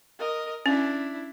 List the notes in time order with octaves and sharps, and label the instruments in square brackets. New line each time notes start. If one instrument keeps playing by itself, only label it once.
[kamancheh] A#4 D#5
[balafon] C#4 [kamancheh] D4 E4